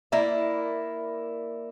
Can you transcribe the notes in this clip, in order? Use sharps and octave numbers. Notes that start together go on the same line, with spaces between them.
A#3 E4 D5